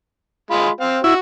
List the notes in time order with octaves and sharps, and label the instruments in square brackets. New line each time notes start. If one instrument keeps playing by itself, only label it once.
[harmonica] G#3 F4 B5
C4 F5
[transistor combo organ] E4 [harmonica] F#4